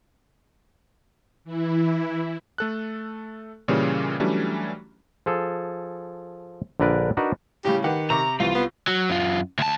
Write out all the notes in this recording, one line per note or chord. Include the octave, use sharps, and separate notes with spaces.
E3 E4
A3 A4 F#6
A#2 C#3 E3 G3 C#4
E3 F#3 G3 A3 C#4 D4
F3 G#4 A4
A#1 D3 A#4 B4 D5
D4 D#4 F#4 A#4 B4
A2 C#3 G3 G4
D#3 G4 B4 F#5
C3 A#5 C#6 D6
C2 E3 F4
B3
F#3
F#2 F4
D2 A5